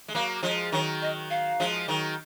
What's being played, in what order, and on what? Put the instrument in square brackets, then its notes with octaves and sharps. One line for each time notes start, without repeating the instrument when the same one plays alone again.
[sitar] G#3
[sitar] F#3 A#3 [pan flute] F5
[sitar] F3 G#3 [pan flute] D#5
[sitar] D#3 F#3 [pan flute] C#5
[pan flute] D#5
F5
[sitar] F3 G#3
D#3 F#3